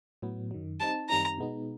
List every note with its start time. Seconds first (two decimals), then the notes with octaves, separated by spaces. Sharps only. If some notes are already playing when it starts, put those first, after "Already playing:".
0.22 A2 F#3 B3
0.51 F#2 D#3 F#3
0.80 G3 C4 D#4 A5
1.09 F#2 D#3 G3 C4 D#4 A#5
1.38 B2 G#3 B3 D#4